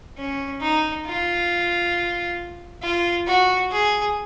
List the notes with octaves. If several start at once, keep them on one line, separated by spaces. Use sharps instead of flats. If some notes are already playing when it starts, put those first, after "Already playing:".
C#4
D#4
F4
F4
F#4
G#4